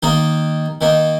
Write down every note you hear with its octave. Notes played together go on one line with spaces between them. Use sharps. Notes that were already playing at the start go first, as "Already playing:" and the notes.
D#3 A#3 D#4
D#3 A#3 D#4